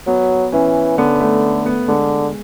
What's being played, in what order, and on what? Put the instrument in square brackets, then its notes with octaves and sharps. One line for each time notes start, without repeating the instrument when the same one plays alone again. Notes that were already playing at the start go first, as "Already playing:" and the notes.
[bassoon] F#3 [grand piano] B3
[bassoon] E3 [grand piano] C#4
[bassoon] D3 [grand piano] B3
[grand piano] A3
B3
[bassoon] D3 [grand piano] G#3